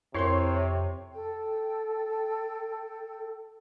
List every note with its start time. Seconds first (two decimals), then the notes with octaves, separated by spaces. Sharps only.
0.14 F2 C3 E4 A#4 C#5 C6 C7
1.13 A4 G5